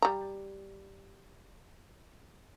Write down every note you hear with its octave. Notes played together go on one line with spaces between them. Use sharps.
G3 A#5